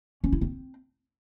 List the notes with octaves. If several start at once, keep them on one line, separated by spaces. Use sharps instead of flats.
C#4
E4
C4